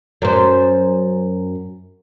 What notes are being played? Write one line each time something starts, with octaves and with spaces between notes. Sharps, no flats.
F#2 C5